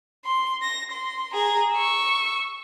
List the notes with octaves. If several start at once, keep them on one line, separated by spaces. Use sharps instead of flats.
C6
A#6
C6
G#4 A#5
C#6 E6